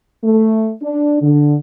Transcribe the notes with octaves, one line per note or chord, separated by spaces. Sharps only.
A3
D4
D3